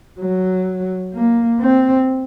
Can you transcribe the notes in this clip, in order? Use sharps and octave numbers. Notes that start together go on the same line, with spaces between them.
F#3
A#3
C4